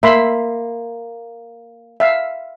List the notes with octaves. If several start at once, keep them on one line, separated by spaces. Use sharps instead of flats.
A#3 E5 B5 C6
E5 F5